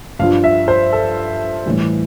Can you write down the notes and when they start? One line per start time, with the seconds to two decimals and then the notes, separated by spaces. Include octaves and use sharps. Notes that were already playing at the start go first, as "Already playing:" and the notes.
0.19 G2 F5
0.23 F3
0.44 E5
0.68 C5
0.93 A4
1.66 A2 E3 G3